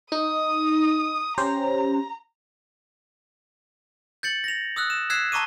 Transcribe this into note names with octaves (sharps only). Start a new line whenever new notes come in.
D#4 D#6
C#4 G4 C5 A#5
G6 A6 C#7 F#7
A#6 F7
D#6 E6 F#6
E7
E6 F#6 G#6 B6 C7 E7
A5 A#5 C#6 D6 D#7